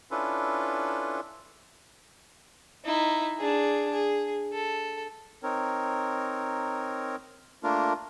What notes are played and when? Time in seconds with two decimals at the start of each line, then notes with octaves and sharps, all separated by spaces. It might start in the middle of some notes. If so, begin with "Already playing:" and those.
0.11 C#4 D4 E4 F4 A4 B4
2.85 D#4 E4
3.37 D4 G#4
3.91 G#4
4.52 A4
5.43 C4 D#4 A#4 C#5
7.63 A3 A#3 D4 F4 A#4